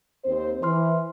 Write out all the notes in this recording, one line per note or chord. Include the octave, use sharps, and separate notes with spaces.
D#2 C4 C5
E3 C5 C6 F6